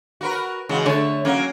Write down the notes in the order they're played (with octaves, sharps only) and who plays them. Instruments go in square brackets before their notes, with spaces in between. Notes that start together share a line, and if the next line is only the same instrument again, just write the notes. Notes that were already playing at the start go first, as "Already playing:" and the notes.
[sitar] F#4 A#4 B4
[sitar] C#3 G#3 F#4 [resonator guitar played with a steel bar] E3
[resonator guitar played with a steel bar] D3 A3 [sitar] C#5
[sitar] F#3 A#3 [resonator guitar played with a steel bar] C#4